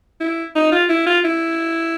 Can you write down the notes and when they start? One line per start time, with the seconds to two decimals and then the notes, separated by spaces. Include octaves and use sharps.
0.20 E4
0.55 D#4
0.72 F4
0.89 E4
1.06 F4
1.24 E4